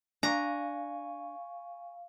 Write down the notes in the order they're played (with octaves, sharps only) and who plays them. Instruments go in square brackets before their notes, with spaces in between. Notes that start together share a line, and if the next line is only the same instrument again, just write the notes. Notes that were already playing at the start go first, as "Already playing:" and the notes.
[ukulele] D4 [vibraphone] F5 [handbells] G#5 C#6 [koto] A#5